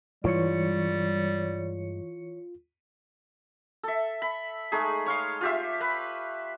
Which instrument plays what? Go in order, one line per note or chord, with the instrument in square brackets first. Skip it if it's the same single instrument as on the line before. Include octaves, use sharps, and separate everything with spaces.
[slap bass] G2 G#3 [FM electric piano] E3 C#5 C#7 [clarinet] G3 [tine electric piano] F4
[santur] A4 E5
B5
G#3 A3 D#4 G#4
C#5 F5 C6
F4 G4 E5
B4 B5